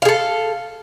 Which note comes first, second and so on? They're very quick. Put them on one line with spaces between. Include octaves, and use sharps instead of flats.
F5 G#4 A4